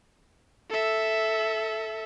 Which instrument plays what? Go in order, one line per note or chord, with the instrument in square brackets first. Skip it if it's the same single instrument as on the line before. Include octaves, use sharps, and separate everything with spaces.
[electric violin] A4 E5